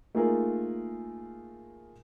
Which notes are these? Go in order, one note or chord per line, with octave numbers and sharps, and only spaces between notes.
A3 A#3 D#4 F4 G#4 A#4